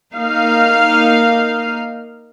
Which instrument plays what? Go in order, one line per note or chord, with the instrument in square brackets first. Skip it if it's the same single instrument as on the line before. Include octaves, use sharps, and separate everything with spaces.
[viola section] A#3 D#4 F5